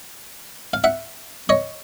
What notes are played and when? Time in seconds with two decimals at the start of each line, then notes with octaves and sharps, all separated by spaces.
0.73 F5
0.84 E5 F#5
1.49 C#5 D#5